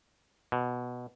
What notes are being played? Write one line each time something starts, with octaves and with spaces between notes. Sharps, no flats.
B2